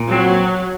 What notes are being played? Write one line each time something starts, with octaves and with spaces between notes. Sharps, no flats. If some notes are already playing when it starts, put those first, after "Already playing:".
Already playing: A#2
F#3 C4